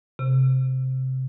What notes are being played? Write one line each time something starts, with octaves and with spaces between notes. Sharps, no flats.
C3